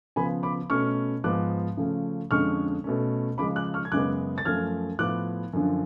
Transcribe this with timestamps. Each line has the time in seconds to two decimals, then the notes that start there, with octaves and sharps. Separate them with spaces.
0.16 C#3 F3 B3 G#5 B5
0.43 B5 D6
0.70 B2 A3 C#4 C#6 F6
1.24 G#2 F3 G#3 B3 D6 F#6
1.77 C#3 F3 A3 C#4
2.31 F2 D3 G#3 C#4 C#6 F6
2.84 B2 A3 C#4
3.38 C#3 F3 G#3 B5 D6
3.56 D6 F#6
3.74 C#6 F6
3.85 G#6
3.92 F#2 C#3 G#3 B3 D6 F#6
4.38 A6
4.45 F#2 F3 A3 F6 G#6
4.99 A2 F3 B3 D6 F#6
5.53 F#2 D3 F3